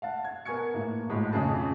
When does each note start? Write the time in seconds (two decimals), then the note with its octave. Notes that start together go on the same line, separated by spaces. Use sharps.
0.02 F5 F#5 A5
0.25 G#6
0.45 B3 A#4 G#5 C#6 G#6 C#7
0.74 A2 A#3 E4
1.09 G#1 A2 G#3 B5
1.33 B1 F2 C#3 G#4 A5